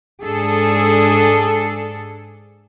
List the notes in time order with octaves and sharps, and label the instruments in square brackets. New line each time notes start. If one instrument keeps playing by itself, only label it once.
[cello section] G#2 D4 G#4 A4